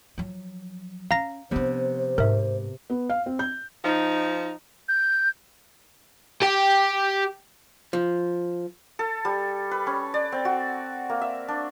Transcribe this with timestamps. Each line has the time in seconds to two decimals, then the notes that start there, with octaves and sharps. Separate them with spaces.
0.18 F3 F#3
1.11 C#4 F5 A#5 A#6
1.51 C3 F3 B3 D4 C5
2.18 G#2 A#4 E5
2.90 B3
3.10 F5
3.26 C4
3.39 G6
3.84 F3 D#4
4.89 G6
6.42 G4 G5
7.93 F3
8.99 A4
9.25 G3
9.71 B4
9.87 C#4
10.14 D5
10.32 C4
10.45 F#4
11.09 A#3
11.21 E5
11.48 D4